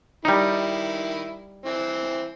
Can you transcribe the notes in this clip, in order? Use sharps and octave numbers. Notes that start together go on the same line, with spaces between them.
D#3 G3 D#4 E4
E3 C4